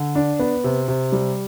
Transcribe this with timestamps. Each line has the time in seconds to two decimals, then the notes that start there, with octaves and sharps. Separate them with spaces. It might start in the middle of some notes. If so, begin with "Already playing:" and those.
Already playing: D3
0.15 D4
0.39 B3
0.64 C3
0.88 C3
1.12 G3